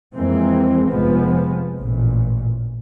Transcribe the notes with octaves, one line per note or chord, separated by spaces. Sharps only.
F2 E3 G#3 A#3 C4
F1 F2 F3 G#3 B3
A1 A#2